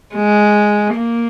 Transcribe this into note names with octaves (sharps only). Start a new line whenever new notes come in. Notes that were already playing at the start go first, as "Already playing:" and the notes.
G#3
A#3